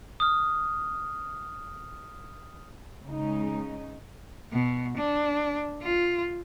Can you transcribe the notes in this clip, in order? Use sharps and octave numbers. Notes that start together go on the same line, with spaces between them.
D#6 F6
C#3 G#3 D#4
B2
D4
F4